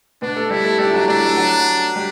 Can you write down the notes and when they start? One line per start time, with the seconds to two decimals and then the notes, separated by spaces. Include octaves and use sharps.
0.22 B2 B3 D4
0.36 A3 A4
0.51 G3 E4 G4
0.65 A3 A4
0.79 G3 D4 G4
0.89 E4
0.94 F#3 F#4
1.08 G3 D4 G4
1.23 A3 A4
1.37 F#3 F#4
1.95 G3 G4